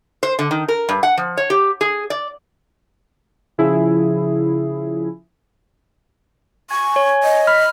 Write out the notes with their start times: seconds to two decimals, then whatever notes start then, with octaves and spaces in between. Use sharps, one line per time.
0.23 C5
0.39 D3
0.51 D#3
0.68 A#4
0.89 G2
1.03 F#5
1.17 F3
1.37 C#5
1.50 G4
1.81 G#4
2.10 D5
3.58 C#3 F3 E4 G#4
6.70 G#5 C#6
6.96 C#5
7.23 D#5
7.47 B5 F6